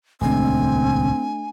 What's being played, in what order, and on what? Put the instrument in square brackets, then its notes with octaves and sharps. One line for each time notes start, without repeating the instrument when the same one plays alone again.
[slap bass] D#1 C#2 [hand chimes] A3 D4 [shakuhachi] C4 [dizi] G#5